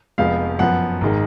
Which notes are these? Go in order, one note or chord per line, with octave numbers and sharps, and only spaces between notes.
F1 F2 F3 G#3 B3 F5
F#2 F3 B3 F#5
G#1 D#3 G#3